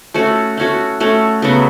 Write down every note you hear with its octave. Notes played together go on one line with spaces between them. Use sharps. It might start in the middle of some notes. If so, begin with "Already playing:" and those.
A3 C#4 F#4
A3 C#4 F#4
A3 C#4 F#4
C#3 F#3 B3 F#4